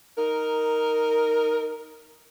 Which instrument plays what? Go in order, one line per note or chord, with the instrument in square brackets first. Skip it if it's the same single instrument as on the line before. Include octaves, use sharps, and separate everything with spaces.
[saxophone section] D#4 A#4